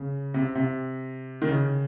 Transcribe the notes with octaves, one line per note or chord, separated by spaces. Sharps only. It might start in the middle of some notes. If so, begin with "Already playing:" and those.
Already playing: C#3
C3
C3
D#3
C#3